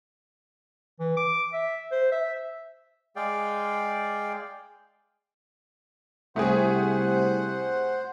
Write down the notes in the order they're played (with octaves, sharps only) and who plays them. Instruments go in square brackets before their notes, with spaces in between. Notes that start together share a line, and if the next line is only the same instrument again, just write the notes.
[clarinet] E3
D6
E5
C5
E5
[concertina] G#3 G#4 D5 F5 G5
[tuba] C2 [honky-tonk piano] A3 G4 G#4 [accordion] C5 [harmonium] F#5